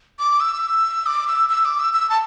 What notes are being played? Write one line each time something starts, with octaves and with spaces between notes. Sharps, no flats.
D6
E6
D6
E6
E6
D6
E6
E6
A5